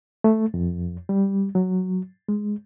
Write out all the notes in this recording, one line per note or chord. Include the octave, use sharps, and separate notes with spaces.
A3
F2
G3
F#3
G#3